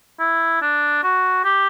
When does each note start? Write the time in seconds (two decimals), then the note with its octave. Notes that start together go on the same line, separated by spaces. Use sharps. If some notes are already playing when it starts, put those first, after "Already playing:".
0.20 E4
0.62 D4
1.04 F#4
1.45 G4